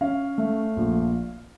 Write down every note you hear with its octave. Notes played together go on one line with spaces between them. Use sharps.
C#4 F5
A3
A#1